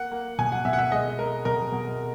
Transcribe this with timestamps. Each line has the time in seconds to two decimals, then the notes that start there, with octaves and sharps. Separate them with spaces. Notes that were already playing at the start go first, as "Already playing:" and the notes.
Already playing: A#3 F#5
0.11 A#3
0.38 B2 G#5
0.52 F#5
0.65 B2 E5
0.73 F#5
0.78 E5
0.92 G#3 D#5
1.19 G#3 A#4
1.45 B2 A#4
1.72 B2